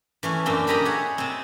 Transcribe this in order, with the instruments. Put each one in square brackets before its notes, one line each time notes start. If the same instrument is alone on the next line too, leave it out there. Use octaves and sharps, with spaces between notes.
[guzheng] E3 A3 C#4
F#2 A#2 C4 D4
E4 G4 A4 D#5 A#5 B5
G#4 C#5 F#5
C3 C4